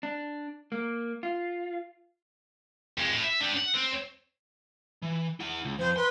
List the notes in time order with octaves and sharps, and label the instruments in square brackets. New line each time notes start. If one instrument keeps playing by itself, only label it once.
[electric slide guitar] D4
A#3
F4
[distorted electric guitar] F2 G#3
A2
E5
D4 G4
F#5
C4
[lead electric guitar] E3
E4 F#5
C#2
[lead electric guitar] F2 [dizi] C5
[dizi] B4 [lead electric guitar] C6